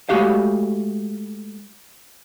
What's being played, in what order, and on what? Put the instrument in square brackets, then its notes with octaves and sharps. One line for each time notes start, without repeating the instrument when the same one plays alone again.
[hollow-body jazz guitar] G#3 A3 F#4 G4 F5